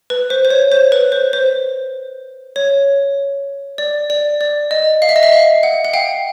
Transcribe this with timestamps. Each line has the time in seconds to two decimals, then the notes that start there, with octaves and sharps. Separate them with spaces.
0.10 B4
0.30 C5
0.45 C5
0.50 C#5
0.72 C5
0.92 B4
1.12 C5
1.33 C5
2.56 C#5
3.78 D5
4.10 D5
4.41 D5
4.71 D#5
5.02 F5
5.09 E5
5.16 D#5
5.23 E5
5.32 F5
5.63 F#5
5.85 F#5
5.93 F5 G5